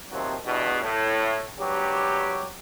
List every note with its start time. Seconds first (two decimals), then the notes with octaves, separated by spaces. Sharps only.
0.11 D#2 C3 D#3 F3 F#3 C4
0.45 E2 G2 B2
0.82 A2
1.60 G#1 G2 F#3 G4